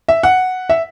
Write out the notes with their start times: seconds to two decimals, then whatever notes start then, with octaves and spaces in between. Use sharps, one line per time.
0.08 E5
0.23 F#5
0.69 E5